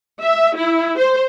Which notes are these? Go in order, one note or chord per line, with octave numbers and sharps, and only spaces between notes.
E5
E4
C5